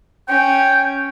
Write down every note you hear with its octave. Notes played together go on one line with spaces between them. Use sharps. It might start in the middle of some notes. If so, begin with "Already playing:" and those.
C#4 G5